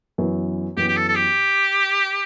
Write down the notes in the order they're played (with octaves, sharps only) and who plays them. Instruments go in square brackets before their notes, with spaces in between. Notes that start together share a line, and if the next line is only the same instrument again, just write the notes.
[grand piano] F#2 E3 B3
[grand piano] F#2 E3 B3 [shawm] G4
[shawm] G4
A4
A4
G4